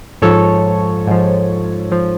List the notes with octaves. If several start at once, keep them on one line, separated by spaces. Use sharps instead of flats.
G#2 F3 A4 C#5
G#2 F3
F3